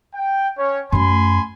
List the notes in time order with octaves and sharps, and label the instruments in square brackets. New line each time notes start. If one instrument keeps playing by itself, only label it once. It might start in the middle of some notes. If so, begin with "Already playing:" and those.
[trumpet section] G5
C#4 C#5
[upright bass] F#2 A3 [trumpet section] G#5 B5 C6